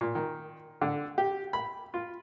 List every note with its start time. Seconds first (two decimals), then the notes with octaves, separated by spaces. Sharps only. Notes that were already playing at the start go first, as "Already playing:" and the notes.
0.01 A#2
0.15 D#3
0.82 D3
1.18 G4
1.53 B5
1.94 F4